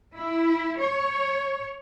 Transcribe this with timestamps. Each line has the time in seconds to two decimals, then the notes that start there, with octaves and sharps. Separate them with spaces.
0.16 E4
0.79 C#5